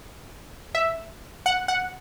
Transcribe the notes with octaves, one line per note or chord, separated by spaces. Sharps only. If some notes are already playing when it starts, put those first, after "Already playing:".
E5
F#5
F#5